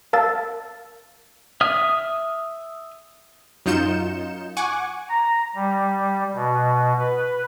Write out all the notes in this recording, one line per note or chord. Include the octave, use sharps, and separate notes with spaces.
A#4 F5 A5 E6 A6
E5 D#6 F6
F#2 D#4 F4 G6 C#7 E7
F#5 G#5 C#6 D6
A#5
G3
B2
B4